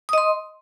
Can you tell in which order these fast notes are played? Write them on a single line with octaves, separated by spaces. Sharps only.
D#6 D#5 C6